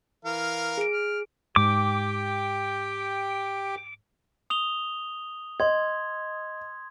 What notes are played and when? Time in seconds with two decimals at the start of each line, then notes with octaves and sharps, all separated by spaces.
0.25 E3 A#4 F5
0.78 G#4 D7
0.92 F6
1.56 G#2 G4 G5 D6
4.50 D#6 F7 G7
5.60 D#5 C6 G#6